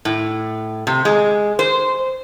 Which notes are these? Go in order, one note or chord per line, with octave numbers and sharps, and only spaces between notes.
A2
C3
G#3
C5